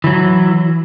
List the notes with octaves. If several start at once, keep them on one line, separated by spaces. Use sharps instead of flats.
E3 F#3